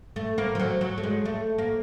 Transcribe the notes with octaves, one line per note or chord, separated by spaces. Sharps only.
A3
A#3
F3
F#3
F#3
A3
G#3
A3
A#3